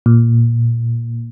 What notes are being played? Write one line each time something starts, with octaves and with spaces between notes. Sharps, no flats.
A#2